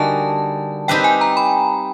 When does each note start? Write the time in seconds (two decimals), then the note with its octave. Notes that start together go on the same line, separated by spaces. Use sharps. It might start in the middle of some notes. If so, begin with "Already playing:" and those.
Already playing: D3 G3 A#3 D#4 F#4 G#5 A5
0.88 C4 D#4 G4 B4 E5 G5
1.04 G#5
1.21 A#5
1.37 B5